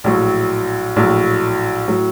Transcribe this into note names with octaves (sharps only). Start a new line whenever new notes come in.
A#1 A2 F#3
A#1 A2 F#3
A2 F#3